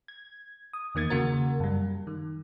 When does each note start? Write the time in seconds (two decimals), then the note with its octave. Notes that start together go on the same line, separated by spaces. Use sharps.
0.08 G#6
0.73 D#6
0.95 E2 D#3 A#3 G#6 A6
1.10 C#3 A#3 F#4 A#4
1.60 F#2 G3
2.07 D#3